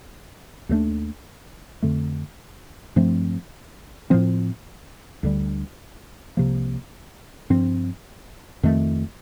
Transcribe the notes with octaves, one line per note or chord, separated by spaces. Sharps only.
D#2 D3 A3 D4
F2 D3 A3
G2 F3 A3 C4
A2 F3 C4
D2 D3 G3
C2 C3 F3 A#3
G2 F3 C4
F2 D#3 A3